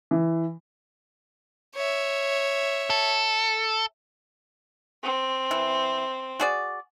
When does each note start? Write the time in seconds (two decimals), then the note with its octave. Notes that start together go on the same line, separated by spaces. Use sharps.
0.11 E3
1.76 C#5 E5
2.90 A4
5.03 C4
5.51 E3
6.40 F#4 G#4 D5